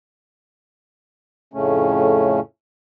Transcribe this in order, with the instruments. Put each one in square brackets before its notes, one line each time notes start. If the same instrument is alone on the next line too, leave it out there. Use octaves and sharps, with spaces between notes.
[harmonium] F2 A2 C#3 A3 C#4